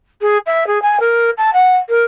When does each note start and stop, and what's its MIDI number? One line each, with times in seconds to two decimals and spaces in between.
0.21 0.38 68
0.46 0.67 76
0.67 0.81 68
0.82 0.97 80
1.00 1.30 70
1.38 1.50 81
1.53 1.76 78
1.89 2.02 70